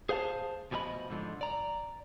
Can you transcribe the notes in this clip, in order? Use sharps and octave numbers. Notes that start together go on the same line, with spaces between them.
G#4 C5 F5 F#5 A5
D2 B2 F3 G#4 D#5 B5
G#2 D3 F3
D5 A#5